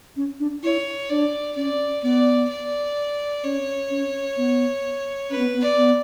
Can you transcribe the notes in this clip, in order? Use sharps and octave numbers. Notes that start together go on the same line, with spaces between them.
C#4
D4
E4 C#5
D4 D5
C#4 D5
B3 D5
D5
C#4 C#5
C#4
B3
C#4 B4
B3
B3
D5
B3